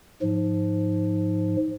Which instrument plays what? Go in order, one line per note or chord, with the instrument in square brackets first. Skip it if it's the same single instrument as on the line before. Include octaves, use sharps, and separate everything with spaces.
[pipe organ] G#2 F3